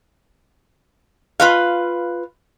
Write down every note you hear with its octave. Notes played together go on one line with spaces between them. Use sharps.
F4 B4 F5